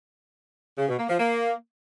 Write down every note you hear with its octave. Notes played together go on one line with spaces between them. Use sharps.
C#3
B2
A#3
F3
A#3